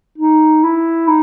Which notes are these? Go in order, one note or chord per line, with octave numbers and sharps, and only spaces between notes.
D#4
E4
D#4